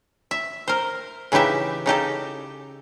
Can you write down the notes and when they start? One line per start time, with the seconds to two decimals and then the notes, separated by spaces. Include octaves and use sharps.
0.31 E5
0.68 A#4 C5
1.32 C#3 E3 D#4 G4 E5
1.86 C#3 D#4 G4 A4